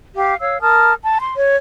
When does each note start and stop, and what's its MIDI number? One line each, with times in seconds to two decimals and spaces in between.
0.15 0.35 67
0.15 0.35 77
0.40 0.60 73
0.40 0.60 77
0.40 0.60 88
0.61 0.92 70
0.61 0.92 81
0.61 0.92 87
0.61 0.92 89
1.01 1.17 81
1.21 1.33 84
1.36 1.57 73